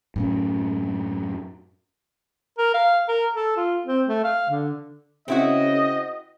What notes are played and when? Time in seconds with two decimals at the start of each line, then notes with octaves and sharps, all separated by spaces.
0.16 F#2 A2 C#4
2.58 A#4
2.74 F5
3.09 A#4
3.36 A4
3.57 F4
3.86 C4
4.07 A3
4.24 F5
4.50 D3
5.28 C#3 C4 E4 F#4 D#5